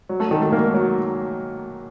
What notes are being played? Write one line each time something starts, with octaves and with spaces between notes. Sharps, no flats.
F#3
A3 A4
D#3 A3 A4
A3 A4
G#2 A#3 A#4
F#3